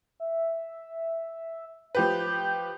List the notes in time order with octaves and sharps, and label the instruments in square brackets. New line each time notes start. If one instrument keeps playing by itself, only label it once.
[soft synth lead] E5
[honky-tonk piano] F3 G4 B4 [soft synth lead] G6